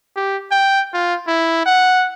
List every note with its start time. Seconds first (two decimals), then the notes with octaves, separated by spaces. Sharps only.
0.16 G4
0.51 G5
0.94 F4
1.27 E4
1.66 F#5